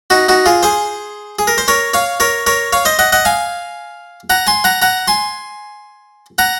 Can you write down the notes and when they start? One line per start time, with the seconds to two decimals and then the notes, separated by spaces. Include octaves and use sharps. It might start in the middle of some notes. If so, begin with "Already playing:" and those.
0.10 D#4 F#4
0.29 D#4 F#4
0.46 F4 G#4
0.63 G#4 C5
1.39 G#4
1.47 A#4
1.58 C5
1.68 A#4 C#5
1.94 C#5 F5
2.20 A#4 C#5
2.46 A#4 C#5
2.73 C#5 F5
2.85 C5 D#5
2.99 D#5 F#5
3.12 D#5 F#5
3.25 F5 G#5
4.30 F#5 A#5
4.47 G#5 C6
4.64 F#5 A#5
4.82 F#5 A#5
5.08 G#5 C6
6.38 F#5 A#5